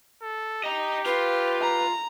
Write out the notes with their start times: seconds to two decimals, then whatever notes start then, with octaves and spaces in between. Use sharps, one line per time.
0.22 A4
0.64 G4 D#5 A#5
1.06 F4 B4
1.61 A#5